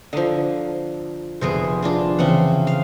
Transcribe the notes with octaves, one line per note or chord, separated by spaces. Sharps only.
D3 F3 D#5 A#5 C7
F1 D3 B3 G#4 C5 D7
D4 F4 G#4
C#3 E3 C4 F#5
F5